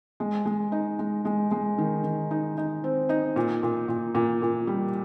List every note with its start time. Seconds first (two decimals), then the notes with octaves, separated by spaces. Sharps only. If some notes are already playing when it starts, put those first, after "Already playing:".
0.20 G#3
0.45 G#3
0.72 D#4
0.99 G#3
1.25 G#3
1.51 G#3
1.78 D#3
2.04 D#3
2.31 D#4
2.57 D#4
2.84 C4
3.09 D#4
3.36 A#2
3.63 A#2
3.88 A#2
4.15 A#2
4.42 A#2
4.67 G3